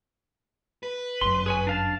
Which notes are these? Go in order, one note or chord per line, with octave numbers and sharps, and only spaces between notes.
B4
G1 F#2 C6
G#4 C#5 G#5
D4 F5 A5